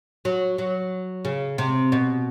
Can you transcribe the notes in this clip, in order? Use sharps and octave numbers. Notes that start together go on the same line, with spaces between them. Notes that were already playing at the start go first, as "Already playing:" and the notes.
F#3
F#3
C#3
C3
B2